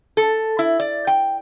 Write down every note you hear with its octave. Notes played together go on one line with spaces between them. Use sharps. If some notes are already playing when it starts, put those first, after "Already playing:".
A4
E4
D5
G5